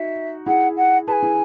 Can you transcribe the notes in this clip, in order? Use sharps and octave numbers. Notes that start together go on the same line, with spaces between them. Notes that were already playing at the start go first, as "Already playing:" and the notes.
Already playing: D#4 F#4 E5
E4 G#4 F#5
F#5
G#4 B4 G#5 A5
E4 G#4